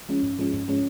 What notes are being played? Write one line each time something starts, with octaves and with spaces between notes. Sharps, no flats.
F3 G#3 C#4
G#2
F3 G#3 C#4
G#2
F3 G#3 C#4